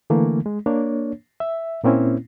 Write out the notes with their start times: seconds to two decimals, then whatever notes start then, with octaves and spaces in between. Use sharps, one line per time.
0.10 D3 E3 A3 A#3
0.46 G#3
0.66 A#3 D4 C#5
1.40 E5
1.84 A#2 A#3 C4 C#4 E4